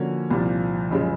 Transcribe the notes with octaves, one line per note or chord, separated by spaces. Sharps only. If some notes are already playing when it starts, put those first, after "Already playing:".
Already playing: D3 F3 A#3 C#4 F#4
C2 A#2 F3
F#1 C#3 F3 G#3